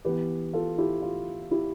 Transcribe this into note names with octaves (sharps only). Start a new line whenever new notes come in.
E3 B3 G4 B4
F4 A4
E4 G4
F4
E4 G4